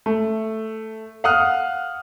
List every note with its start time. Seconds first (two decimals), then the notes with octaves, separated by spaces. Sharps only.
0.06 A3
1.24 F5 F#5 D#6 F6 F#6